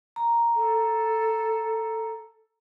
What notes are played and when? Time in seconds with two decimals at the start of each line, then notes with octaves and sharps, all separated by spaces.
0.16 A#5
0.56 A4